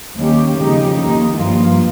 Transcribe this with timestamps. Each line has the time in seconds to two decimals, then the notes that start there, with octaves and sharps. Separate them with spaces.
0.16 D#2 D#3 A#3 C#4 G4
0.57 F2 C#3 G#3 D#4 G4
0.97 D#2 D#3 A#3 D#4
1.36 G2 F3 A#3 F4